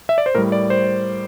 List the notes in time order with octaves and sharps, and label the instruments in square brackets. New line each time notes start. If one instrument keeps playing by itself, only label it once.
[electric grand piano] E5
D5
C5
A2 G3 A#4
D5
C5